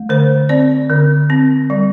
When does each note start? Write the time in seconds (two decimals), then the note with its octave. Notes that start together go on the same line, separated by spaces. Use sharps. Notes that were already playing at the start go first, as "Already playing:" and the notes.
Already playing: A3
0.09 D3 C5
0.49 C4 D5
0.90 D3
1.30 C4
1.70 G3